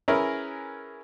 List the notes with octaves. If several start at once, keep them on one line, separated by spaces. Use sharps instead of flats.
C#4 E4 G#4 A#4 B4